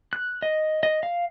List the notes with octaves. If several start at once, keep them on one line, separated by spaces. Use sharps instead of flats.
F#6
D#5
D#5
F5